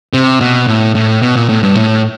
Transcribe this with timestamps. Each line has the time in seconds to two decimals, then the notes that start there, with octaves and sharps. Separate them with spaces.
0.14 C3
0.41 B2
0.67 A2
0.95 A2
1.22 B2
1.36 A#2
1.49 A2
1.63 G2
1.77 A2